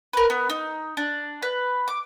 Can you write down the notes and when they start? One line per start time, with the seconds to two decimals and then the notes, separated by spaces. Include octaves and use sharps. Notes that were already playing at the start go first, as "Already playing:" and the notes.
0.13 A#4 B4
0.30 B3
0.50 D#4
0.97 D4
1.42 B4
1.88 D6